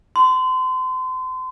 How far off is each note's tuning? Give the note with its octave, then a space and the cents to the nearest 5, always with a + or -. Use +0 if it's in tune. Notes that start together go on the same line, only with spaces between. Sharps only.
C6 -35